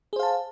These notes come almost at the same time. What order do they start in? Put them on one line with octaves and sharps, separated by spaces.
G#4 C5 F5 A5